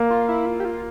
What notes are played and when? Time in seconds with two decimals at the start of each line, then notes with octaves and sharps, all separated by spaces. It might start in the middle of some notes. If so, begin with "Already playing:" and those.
Already playing: A#3
0.10 F4
0.28 E4
0.46 F4
0.60 G4
0.65 F4